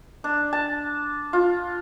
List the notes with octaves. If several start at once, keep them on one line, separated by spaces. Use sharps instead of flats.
D4
A5
F4